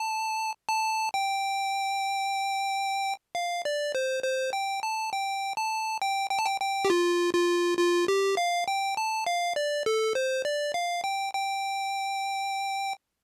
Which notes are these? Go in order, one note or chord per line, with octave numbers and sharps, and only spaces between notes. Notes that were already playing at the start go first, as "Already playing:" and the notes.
Already playing: A5
A5
G5
F5
D5
C5
C5
G5
A5
G5
A5
G5
G5
A5
G5
G5
G4
F4
F4
F4
G4
F5
G5
A5
F5
D5
A4
C5
D5
F5
G5
G5